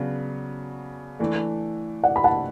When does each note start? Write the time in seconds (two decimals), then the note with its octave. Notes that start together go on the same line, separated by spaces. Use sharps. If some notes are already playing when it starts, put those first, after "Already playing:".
Already playing: C#3 F#3 B3 D4
1.19 E3 A3 D4
2.03 D5 F#5
2.16 B5
2.24 F#5 A5